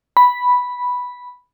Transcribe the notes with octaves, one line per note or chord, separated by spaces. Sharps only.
B5